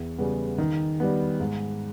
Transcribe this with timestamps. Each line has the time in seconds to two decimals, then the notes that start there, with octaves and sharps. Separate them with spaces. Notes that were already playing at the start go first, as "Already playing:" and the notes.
Already playing: E2
0.18 C#3 G3 B3
0.58 D#3
1.00 G3 B3
1.40 G#2